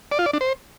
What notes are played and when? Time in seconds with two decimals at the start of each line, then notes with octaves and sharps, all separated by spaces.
0.12 D5
0.19 F4
0.26 D5
0.33 D4
0.41 C5